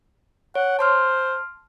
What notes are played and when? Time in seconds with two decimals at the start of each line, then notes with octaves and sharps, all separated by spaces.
0.55 C#5 F#5
0.79 C5 A5 C6 F6